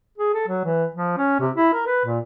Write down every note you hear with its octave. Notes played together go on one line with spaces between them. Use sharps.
G#4
A4
F#3
E3
F3
C#4
C3
E4
A#4
B4
A#2